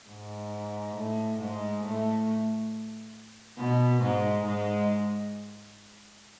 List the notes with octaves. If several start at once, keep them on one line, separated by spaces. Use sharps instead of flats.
G#2
A2
G#2 G#3
A2 A3
B2 B3
G#2 G#3
G#2 G#3